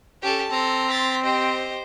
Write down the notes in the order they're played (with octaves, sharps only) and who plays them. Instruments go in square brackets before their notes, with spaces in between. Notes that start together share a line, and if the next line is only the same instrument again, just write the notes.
[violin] C#4 A5 [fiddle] G4 A4
[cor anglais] C4 [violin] A4 [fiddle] A#5 C6
[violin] A6 B6
[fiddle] G4 D#5 [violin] C5